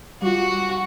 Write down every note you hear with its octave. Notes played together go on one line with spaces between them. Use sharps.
G3 F4 F#4